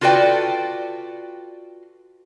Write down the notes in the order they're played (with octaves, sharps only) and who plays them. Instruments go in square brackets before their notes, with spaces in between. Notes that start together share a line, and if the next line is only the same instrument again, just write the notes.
[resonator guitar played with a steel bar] F4 F#4 A4 B4 D5 G5